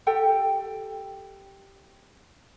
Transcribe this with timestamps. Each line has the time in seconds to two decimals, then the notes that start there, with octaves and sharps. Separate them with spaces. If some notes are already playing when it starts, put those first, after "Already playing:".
0.07 G4 A4 G5